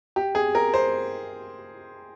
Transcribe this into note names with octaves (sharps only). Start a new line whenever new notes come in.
G4
G#4
A#4
C5